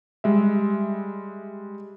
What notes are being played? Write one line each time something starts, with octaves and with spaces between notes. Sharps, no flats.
G3 G#3 E5